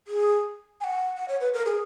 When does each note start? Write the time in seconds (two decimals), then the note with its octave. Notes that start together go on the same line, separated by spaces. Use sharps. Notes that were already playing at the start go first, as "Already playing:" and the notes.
0.07 G#4
0.81 G#5
0.84 F#5
1.17 F#5
1.28 C#5
1.40 B4
1.54 A#4
1.66 G#4